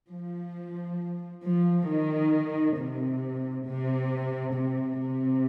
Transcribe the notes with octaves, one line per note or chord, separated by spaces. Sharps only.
F3
F3
D#3
C3
C3
C3
C3